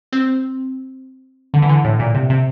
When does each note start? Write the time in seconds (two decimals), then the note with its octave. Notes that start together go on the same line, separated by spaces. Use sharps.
0.13 C4
1.54 D3
1.62 E3
1.69 D3
1.85 A2
1.99 A#2
2.14 C3
2.30 C3